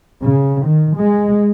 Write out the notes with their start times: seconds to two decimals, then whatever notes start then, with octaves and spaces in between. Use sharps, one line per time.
0.22 C#3
0.65 D#3
0.97 G#3